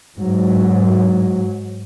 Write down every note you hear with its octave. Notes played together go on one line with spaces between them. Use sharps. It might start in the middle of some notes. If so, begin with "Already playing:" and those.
G#2 F#3